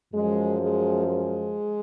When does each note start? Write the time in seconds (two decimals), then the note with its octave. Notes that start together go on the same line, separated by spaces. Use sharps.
0.14 F#2 F3 G#3
0.62 G#3
1.08 G#3